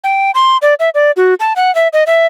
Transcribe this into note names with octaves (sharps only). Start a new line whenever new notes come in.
G5
C6
D5
E5
D5
F#4
A5
F#5
E5
D#5
E5